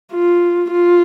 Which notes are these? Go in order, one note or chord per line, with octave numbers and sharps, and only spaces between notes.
F4
F4